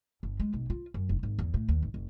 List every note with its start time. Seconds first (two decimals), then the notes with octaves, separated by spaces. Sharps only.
0.23 G1
0.40 G#3
0.53 B1
0.70 F4
0.94 F#2
1.09 F1
1.23 G#1
1.39 E2
1.54 A2
1.69 D#2
1.82 G#1
1.94 F#1